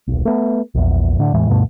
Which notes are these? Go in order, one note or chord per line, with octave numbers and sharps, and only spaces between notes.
D#1 B1
A3 B3
A#1 E2
A2 D3 D4
E2 A2 E3 G#3
D2 G2 B2 A3